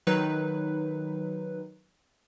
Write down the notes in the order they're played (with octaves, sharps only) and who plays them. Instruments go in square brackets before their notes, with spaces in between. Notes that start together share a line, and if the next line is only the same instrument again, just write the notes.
[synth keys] D#3 F#3 D#4 B4